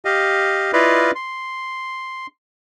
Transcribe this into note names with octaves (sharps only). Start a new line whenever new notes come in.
G4 D#5 F5
E4 F4 B4 D5 D#5 F5
C6